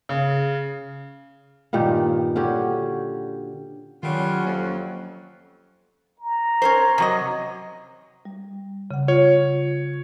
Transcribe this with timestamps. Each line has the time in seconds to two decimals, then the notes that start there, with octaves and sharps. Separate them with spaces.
0.09 C#3
1.73 G2 A#2 D#3 G4
2.36 D3 C#4 F#4 G4
4.03 D#3 F#3 G3 A3 C#4 F4 F#5 F#6
4.46 F2 A#3
6.20 A#5
6.62 C#4 A#4 C5
6.98 C3 F#3 D#5
8.25 G3
8.91 C#3 F#5
9.08 F4 C#5